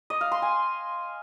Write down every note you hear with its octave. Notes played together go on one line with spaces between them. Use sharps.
D#5
F5
C6
G#5